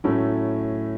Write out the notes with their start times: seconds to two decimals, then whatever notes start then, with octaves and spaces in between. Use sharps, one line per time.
0.04 A2 F#3 A3 C#4 E4